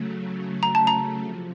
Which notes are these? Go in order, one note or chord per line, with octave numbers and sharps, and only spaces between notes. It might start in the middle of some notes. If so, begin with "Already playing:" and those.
Already playing: C#3 F#3 A3
A#5
A5
A#5
C3 F3